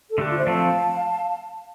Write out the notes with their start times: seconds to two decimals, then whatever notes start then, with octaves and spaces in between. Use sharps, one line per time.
0.09 A4
0.18 D3 A3 D4 G4
0.28 F4
0.37 C5 E5
0.47 F3 A3 C4 F5 A5